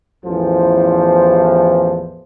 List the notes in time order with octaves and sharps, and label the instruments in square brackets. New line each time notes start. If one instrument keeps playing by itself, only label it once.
[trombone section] A1 E2 E3 F3 A4 C5